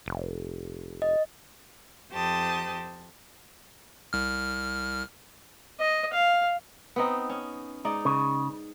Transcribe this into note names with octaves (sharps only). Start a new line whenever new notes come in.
F1
D#5
F2 G4 C5 A5 D#6
C2 F6
D#5
F5
B3 C4 D#4
C#4
G#2 D#4 D5
C#3